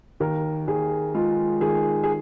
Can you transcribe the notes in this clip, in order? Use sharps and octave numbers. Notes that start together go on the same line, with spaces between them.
D#2 A#4
D#2 G#4
G#3 F4
D#3 G#4
G#4